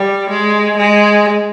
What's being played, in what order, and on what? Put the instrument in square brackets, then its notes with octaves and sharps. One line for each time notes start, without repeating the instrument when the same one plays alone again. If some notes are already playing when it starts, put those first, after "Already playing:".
Already playing: [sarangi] G3
G#3
G#3